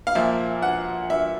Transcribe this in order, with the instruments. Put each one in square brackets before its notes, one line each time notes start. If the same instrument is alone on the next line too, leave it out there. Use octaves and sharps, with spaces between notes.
[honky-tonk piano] F5
[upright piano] A#2 F3 A#3 [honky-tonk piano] E5
[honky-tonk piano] F#5
E5